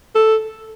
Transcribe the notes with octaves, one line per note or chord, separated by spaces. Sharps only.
A4